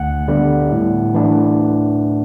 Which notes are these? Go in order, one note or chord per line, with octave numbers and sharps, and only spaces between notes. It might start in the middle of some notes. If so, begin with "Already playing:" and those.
Already playing: D2 F#5
D3 G3 B3
A2
E3 A3 D4